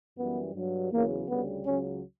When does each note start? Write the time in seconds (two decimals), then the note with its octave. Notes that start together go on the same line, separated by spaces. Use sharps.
0.18 F#2 E3 G3 B3
0.55 G2 F#3
0.92 E2 C#3 F#3 A#3
1.28 D2 C#3 G3 B3
1.65 C#2 C#3 F#3 C#4